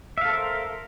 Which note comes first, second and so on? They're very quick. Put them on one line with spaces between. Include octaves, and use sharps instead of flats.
E5 F5 A4 C5 A#4